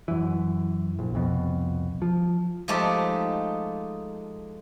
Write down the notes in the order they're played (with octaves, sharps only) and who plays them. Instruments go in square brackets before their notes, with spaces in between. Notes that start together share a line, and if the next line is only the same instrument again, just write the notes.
[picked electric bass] F#2 E3
A#1
C2 F2 B2
F3
[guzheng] F3 G#3 A3 D#4 G4